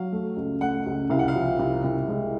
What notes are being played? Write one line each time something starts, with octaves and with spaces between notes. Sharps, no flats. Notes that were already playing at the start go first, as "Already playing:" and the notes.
Already playing: F#3 F5
A3
C#2
A3 F#5
C#2
C2 F5
F#5
F5
F3
C2
C2
G#3